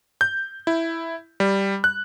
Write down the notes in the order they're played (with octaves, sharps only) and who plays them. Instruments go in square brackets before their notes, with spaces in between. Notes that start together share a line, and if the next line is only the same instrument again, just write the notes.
[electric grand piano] G6
E4
G3
F#6